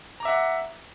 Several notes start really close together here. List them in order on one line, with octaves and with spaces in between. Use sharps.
A#5 D6 E5 F#5